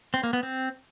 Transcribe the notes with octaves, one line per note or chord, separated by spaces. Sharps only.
C4
A#3
B3
C4